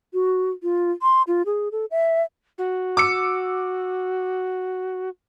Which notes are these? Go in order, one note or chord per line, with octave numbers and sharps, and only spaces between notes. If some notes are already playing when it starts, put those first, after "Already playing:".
F#4
F4
C6
F4
G#4
A4
E5
F#4
D6 E6 C#7